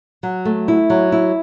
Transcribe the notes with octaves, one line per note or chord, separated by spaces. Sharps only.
F#3
A3
E4
F#3
E4